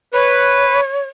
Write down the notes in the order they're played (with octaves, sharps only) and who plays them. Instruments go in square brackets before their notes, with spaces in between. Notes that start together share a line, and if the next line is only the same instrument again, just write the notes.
[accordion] B4 [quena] C#5